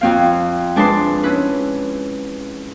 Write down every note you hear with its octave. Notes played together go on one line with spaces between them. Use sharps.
F2 C4 F5
G#3 D4 B4 A5 C6
C#4 E4 B4